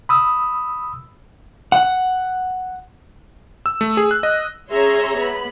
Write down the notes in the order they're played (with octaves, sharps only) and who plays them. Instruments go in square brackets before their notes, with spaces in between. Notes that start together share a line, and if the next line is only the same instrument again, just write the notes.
[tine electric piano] B5 D#6 E6
[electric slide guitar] F#5
[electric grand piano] E6
A3
G#4
F#6
D#5
[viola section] C#4 G#4 C#5 E5 A#5 C6
B3 B5